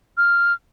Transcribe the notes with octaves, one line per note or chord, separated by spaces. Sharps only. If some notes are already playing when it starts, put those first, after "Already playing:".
F6